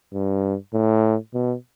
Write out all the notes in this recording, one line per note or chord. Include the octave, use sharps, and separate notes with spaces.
G2
A2
B2